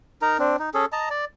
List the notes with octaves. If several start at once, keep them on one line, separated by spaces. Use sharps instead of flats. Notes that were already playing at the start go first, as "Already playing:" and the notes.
D#4 A#4 A#5
C4 D4
D#4
C#4 G#4 A4
D#5 A5 A#5
D5